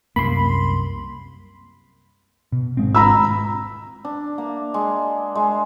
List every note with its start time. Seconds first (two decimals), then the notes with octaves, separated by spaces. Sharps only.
0.16 C2 F#2 A#3 B5 C6
2.52 B2
2.77 G#1 G#3 C4
2.95 A#5 B5 E6
4.05 D4
4.38 A#3
4.74 G#3
5.35 G#3